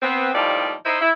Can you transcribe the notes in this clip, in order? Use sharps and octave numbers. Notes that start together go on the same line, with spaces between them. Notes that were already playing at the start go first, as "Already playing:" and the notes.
B3 C4
D#2 A2 F3 G3 D#4 D5
D#4 E4 C5
E4